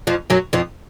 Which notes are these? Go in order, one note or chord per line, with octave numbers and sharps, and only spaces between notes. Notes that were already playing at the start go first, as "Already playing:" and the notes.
F2 F3
F#2 F#3
F2 F3